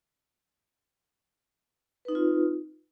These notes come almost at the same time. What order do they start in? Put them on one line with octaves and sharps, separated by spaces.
B4 D#4 C4 F4